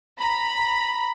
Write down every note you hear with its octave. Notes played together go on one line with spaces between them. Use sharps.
A#5 B5